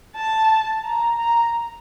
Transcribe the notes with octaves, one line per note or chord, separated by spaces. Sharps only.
A5
A#5
A#5